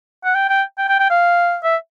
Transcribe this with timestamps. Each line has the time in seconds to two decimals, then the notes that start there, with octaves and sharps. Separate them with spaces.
0.25 F#5
0.35 G5
0.50 G5
0.78 G5
0.89 G5
1.00 G5
1.10 F5
1.63 E5